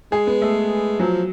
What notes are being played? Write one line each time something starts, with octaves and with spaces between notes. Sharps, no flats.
G#3 G#4
B3
A3
F3 F#3